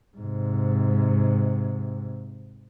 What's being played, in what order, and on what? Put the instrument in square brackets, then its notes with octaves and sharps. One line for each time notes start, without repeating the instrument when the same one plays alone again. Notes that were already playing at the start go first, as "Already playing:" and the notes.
[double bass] G#2 C3